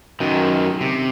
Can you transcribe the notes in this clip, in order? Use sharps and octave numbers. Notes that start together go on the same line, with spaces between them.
F#2 D#3
C3